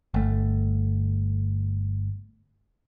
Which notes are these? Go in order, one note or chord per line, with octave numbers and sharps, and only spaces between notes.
G1 A3